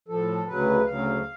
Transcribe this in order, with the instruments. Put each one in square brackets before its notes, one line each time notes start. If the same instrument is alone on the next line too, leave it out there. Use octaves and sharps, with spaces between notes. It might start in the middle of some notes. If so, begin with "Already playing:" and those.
[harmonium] A2 F3 A4
D2 C#3 F#3 B4
D2 C#3 F#3 F5